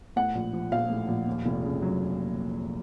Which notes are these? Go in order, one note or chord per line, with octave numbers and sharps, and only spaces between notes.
A2 F#5
A#1
F3
A#1 F5
A2
A#1
D#2
F1
C#3
F#3